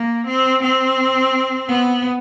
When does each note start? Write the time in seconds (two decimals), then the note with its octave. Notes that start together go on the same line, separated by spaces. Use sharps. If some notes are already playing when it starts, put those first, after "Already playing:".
Already playing: A#3
0.27 C4
0.63 C4
1.68 B3